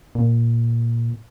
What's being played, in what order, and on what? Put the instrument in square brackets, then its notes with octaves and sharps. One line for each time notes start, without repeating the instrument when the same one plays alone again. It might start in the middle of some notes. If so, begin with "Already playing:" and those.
[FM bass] A#2